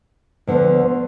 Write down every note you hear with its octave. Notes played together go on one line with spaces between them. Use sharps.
D2 D3 F3 B3